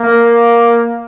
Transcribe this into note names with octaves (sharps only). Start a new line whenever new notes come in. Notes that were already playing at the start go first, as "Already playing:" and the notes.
Already playing: A#3